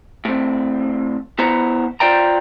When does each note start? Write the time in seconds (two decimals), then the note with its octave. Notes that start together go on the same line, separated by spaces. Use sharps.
0.25 A2 C4
1.39 B3 E4 C5 F#5 A#5
2.00 F4 C5 D5 G5 A#5